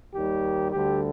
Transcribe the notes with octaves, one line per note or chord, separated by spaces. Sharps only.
D#2 D#3 G3 G4
D2 D3 G3 G4